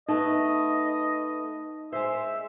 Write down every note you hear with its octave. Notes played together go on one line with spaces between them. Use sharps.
A3 B3 D#4 D#5 A5
G#3 C5 E5